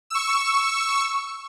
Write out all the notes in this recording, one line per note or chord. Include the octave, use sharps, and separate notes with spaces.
C#6 E6